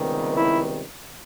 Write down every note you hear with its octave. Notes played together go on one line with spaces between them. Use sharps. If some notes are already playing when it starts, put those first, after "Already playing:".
Already playing: C#2 C3 D#3 G3 B3
E4